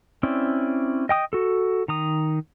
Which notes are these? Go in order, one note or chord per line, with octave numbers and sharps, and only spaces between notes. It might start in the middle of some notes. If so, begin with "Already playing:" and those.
C4 C#4 E4 D5
D#5 G5 D#6
F#4 A4
D#3 A#5 D#6